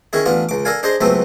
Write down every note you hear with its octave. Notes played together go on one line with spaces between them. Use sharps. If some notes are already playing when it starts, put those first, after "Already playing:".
D#3 C#4 E4 G#4
A1 B3 D4 F4
C#2 D6
A4 A#4 D5 F5 G#5
D4 G#4 C5 D#5 C6
C#2 F#3 A3 B3 C4 A4